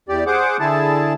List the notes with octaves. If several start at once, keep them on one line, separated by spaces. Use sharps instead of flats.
E2 G4 D5
G#4 C5 F#5 D6
D3 E4 G#4 A5